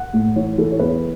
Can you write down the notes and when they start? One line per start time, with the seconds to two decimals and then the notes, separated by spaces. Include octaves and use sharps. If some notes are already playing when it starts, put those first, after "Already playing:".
Already playing: F#5
0.14 A2
0.36 E3 C#5
0.58 E3 A4
0.72 C#5
0.80 E2 B4